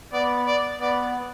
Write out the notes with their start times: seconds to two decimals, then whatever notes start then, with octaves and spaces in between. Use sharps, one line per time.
0.13 B3 D5
0.46 D5
0.80 B3 D5